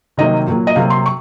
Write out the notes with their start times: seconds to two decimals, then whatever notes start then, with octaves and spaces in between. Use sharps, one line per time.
0.17 C3 D#3 F#3 A#3 D#5
0.47 A#2 F#3 A#3
0.67 D#5
0.76 C3 F#3 A#3 F5
0.90 C6
1.06 C#6